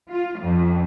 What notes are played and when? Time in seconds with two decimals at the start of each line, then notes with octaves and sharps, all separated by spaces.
0.10 F4
0.41 F2